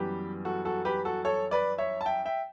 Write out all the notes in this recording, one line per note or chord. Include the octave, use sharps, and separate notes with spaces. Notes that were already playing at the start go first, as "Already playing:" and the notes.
Already playing: F#2 E3 G3 B3 G4 B4
F#4 A4
F#4 A4
G4 B4
F#4 A4
A4 C#5
B4 D5
C#5 E5
A5
E5 G5
E5 G5